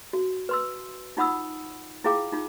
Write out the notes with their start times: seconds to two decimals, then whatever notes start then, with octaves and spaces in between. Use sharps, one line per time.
0.13 F#4
0.49 B4 C6 E6
1.17 D#4 F4 F#5 B5 D#6 E6
2.04 E4 F4 G#4 F5 G5 D6
2.32 D#4 F4